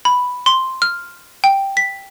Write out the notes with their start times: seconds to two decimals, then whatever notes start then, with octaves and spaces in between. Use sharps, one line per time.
0.05 B5
0.46 C6
0.82 F6
1.44 G5
1.77 B6